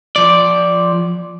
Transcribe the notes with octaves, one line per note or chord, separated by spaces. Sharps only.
F3 D5